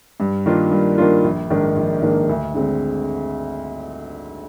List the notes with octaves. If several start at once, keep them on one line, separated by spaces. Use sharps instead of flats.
G2
D#3 A#3 D4 F4
G2
D#3 A#3 D4 F4
A#1
G#2 D#3 A#3 D4
A#1
G#2 D#3 A#3 D4
D2
D3 G#3 C4